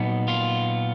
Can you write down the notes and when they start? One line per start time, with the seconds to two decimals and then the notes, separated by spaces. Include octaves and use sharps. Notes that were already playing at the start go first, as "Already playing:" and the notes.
Already playing: A#2 F#3 B3 D#4
0.28 F4